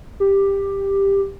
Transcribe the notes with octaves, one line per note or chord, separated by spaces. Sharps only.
G4